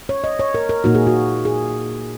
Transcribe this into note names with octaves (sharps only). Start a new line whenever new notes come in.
C#5
D#5
C#5
A#4
A#4
A#2 A#3 D#4 F#4
G#4
F#4
G#4